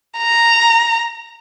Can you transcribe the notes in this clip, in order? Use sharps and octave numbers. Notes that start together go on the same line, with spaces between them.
A#5